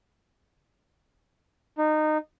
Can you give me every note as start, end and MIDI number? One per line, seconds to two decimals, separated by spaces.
1.78 2.18 63